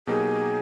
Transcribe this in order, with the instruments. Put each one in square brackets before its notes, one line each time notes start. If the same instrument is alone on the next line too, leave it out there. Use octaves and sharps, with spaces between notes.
[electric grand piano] B2 F#3 A#3 D#4 G4 [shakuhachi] G#4